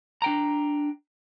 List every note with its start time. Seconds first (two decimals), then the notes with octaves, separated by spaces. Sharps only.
0.22 D4 G5 A#5